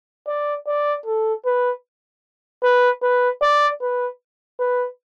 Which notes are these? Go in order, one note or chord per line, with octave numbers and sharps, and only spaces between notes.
D5
D5
A4
B4
B4
B4
D5
B4
B4